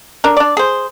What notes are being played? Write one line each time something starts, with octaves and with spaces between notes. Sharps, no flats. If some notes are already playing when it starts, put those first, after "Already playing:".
D4 A#4
D4 D5
G#4 C5